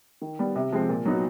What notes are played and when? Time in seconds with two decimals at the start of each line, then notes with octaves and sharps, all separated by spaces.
0.22 D#3
0.39 G3 B3
0.56 C3
0.72 F3 G#3 C4
0.89 A#2
1.05 F#3 B3 D#4 F#4